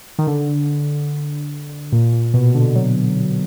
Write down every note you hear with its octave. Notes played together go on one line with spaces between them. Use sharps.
D#3
D3
A#2
A#2
B2
D3
F#3